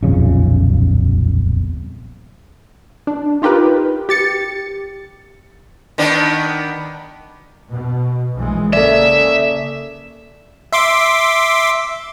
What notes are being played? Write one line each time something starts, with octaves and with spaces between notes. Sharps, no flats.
D#1 B1 F2 C#3
D4
D#4 F4 G4 A#4 B4
G4 A6 C#7
D#3 B3 D4
B2
A#1 E3 G#3
C#3 A#3 A4 D5 E5
E5 C6 D6